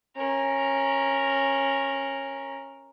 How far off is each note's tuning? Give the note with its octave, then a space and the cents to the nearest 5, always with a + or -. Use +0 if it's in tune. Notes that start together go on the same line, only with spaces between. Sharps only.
C#4 -15 A#4 +0